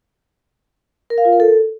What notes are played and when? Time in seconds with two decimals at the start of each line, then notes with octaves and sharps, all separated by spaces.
1.10 A#4
1.18 F5
1.25 F4
1.32 A#4
1.40 A4